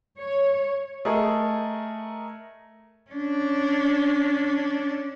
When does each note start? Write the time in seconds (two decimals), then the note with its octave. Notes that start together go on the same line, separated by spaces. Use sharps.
0.19 C#5
1.05 A3 G#4 A#4 D#5
3.11 C#4 D4